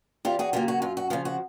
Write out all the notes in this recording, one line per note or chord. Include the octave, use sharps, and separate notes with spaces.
E2 F4 G4
F#4 G#4
C#3 F#3 A#3 F4 G4
F#4
F#2 F4
F#4
C#3 F3 F4
F#4